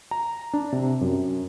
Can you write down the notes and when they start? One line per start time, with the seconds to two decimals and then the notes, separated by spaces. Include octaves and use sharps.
0.11 A#5
0.53 D4
0.72 C3
1.01 F#2